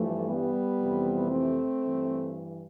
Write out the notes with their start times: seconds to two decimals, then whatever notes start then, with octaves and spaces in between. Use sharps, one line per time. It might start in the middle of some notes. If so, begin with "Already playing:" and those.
Already playing: G2 E3 F3 A3
0.29 G3 B3
0.80 F2 C3 E3
1.31 A3 C4
1.83 G2 E3